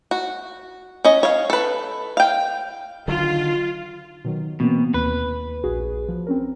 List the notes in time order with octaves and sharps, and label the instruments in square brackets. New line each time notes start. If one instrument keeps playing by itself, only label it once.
[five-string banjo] F#4
C#4 D#5
C#5 F5
A4 B4
F5 G5
[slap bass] D3 D#3 F#3 [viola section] F4
[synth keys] B2 D#3 F#3
[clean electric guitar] B2 [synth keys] E3 A#3 C4
[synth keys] D#2 [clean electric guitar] B4
[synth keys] A#1 F#4 G#4
F3
C4 C#4 A#4